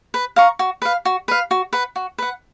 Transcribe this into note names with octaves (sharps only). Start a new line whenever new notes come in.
B4
F5 A#5 C#6
F#4
B4 F5
F#4
B4 F5
F#4
B4 F#5
F#4
B4 F#5